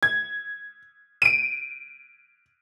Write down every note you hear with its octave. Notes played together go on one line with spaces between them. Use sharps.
G#6
D7 D#7